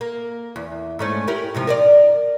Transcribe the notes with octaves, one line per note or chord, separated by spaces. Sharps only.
A#3
E2
G#2 A3 C#4
E4 G4 A#4
G#2 C3 F3
A#4 C5 D5